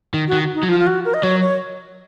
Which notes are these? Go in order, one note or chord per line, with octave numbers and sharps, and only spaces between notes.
D#3
F#4
D#3
D#4
F#3
F3 F4
F4
F#4
A#4
D#5
F#3 C#5
C#5